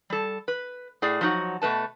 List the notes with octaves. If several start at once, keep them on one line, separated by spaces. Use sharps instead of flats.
G3 A4
B4
A2 G#4 D5
F3 F#3 D#4 F4 F#4
B2 A3 B4 A5